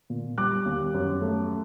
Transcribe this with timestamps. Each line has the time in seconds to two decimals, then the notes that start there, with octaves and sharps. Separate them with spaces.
0.10 A#2
0.38 G3 D6 F#6
0.66 D#2
0.94 F#2
1.22 A3